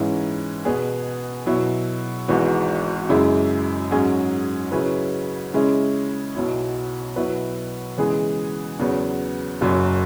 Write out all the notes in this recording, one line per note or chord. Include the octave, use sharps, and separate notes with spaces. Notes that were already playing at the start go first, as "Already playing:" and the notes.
Already playing: G#2 E3 C#4 E4
B2 B3 G#4 B4
B2 F#3 E4
G#1 G#2 E3 B3 F#4
F#2 C#3 G#3 E4
G#2 F#3 C#4 G#4
C#3 F#3 C#4 E4 B4
C#3 G#3 C#4 E4
B1 B2 F#3 E4 C#5
B2 F#3 E4 B4
C#3 E3 G#3 B3 G#4
E2 C#3 F#3 B3
F#1 F#2 F#3